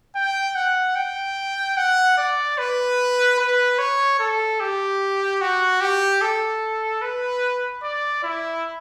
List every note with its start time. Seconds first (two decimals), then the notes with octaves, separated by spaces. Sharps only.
0.16 G5
0.56 F#5
0.96 G5
1.77 F#5
2.18 D5
2.58 B4
3.39 B4
3.79 C#5
4.19 A4
4.60 G4
5.41 F#4
5.81 G4
6.22 A4
7.02 B4
7.83 D5
8.23 E4